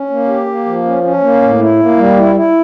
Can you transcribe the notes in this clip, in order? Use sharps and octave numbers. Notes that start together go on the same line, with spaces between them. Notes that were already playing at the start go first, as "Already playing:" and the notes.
Already playing: C#4
A#3
G4
A#3
F3
C#4
C#4
A#3
A2
E4
A#3
G3
E4
E4